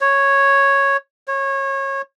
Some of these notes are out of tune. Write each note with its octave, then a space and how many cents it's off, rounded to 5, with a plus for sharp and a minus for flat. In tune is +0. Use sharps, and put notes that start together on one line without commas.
C#5 -5
C#5 -25